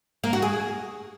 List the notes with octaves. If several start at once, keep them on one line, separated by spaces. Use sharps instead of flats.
A#3
F#4
G#4